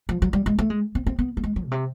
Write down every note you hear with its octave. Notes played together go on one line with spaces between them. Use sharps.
F3
F#3
G3
G#3
A3
G#3
C4
C4
B3
A3
G#3
F#3
B2
C3